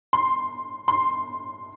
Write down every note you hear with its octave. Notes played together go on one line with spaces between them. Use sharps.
C6
C6